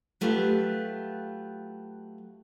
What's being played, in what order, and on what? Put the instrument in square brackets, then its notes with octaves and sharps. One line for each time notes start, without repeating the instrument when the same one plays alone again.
[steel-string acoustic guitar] F#3 A3 F4 G4 B4